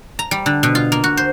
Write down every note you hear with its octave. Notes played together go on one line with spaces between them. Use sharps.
A#5
G3
D3
B2
F4
A#3
F#4
C5